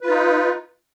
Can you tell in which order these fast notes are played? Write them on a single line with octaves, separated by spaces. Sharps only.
B4 F4 D#4